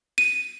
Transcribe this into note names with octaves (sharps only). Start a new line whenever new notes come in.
D#7